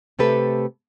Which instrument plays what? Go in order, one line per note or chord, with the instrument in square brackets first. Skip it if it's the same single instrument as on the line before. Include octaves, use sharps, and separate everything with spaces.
[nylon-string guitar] C3 A3 G4 A4 B4